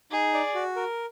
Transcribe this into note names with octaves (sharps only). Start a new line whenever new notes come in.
D#4 G#4
D5
F#4
A#4